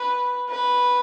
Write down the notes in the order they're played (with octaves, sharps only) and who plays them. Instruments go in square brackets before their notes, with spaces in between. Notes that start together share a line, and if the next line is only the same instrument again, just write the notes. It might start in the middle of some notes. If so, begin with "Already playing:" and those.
Already playing: [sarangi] B4
B4